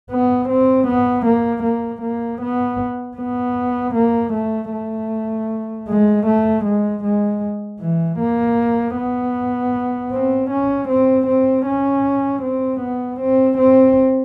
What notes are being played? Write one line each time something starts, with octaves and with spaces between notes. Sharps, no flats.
B3
C4
B3
A#3
A#3
A#3
B3
B3
A#3
A3
A3
G#3
A3
G#3
G#3
E3
A#3
B3
C4
C#4
C4
C4
C#4
C4
B3
C4
C4